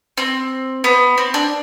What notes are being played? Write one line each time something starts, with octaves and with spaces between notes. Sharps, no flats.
C4
B3
C4
D4